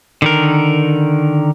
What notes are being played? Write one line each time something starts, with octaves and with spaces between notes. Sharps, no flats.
D3 D#3 A#4